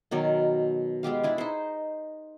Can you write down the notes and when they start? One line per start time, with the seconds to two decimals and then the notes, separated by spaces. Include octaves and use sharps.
0.11 B2 D#3 F#3 A#4
1.03 G#3 B3 G4 F5
1.23 D4 E4 G#4
1.38 D#4 C5